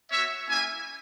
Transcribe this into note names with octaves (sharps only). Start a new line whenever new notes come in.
B3 F#4 C#5 E5
A#3 C#4 E4 E5 G#5